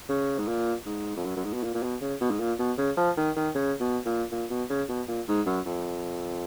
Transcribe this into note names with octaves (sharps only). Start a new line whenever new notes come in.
C#3
G#2
A#2
G#2
F2
F#2
F#2
G#2
B2
A#2
A#2
B2
C#3
B2
G#2
A#2
B2
C#3
F3
D#3
D#3
C#3
B2
A#2
A#2
B2
C#3
B2
A#2
G#2
F#2
F2